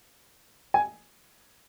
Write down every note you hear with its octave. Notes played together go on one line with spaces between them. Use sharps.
G#5